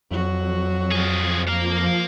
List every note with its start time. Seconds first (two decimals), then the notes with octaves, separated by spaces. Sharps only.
0.11 F2 F#3 F#4
0.91 F3 G#4
1.48 F3 A#3 F5